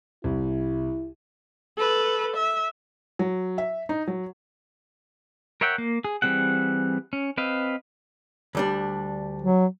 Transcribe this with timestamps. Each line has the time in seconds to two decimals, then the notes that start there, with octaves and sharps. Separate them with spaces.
0.24 C2 E4
1.77 A4 B4
2.37 E5
3.19 F#3
3.58 E5
3.89 D#4
4.07 F#3
5.61 A#4 C#5 E5 F#5 G5
5.78 A#3
6.05 G#4
6.22 E3 G3 C4 G#4 F#5
7.13 C#4
7.38 C4 B4 D#5 F5
8.55 D2 G3 D4
9.42 F#3